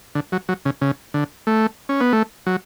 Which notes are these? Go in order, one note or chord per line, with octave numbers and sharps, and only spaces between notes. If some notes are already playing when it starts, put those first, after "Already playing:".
D3
F#3
F#3
C#3
C#3
D3
A3
C#4
B3
A3
F#3